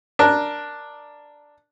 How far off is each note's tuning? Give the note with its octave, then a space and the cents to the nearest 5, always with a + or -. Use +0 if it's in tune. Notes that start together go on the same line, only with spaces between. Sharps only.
D4 +0 A#4 +0